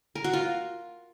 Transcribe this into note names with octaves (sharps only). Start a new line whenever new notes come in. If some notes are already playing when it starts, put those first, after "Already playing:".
A#4
F#4
F4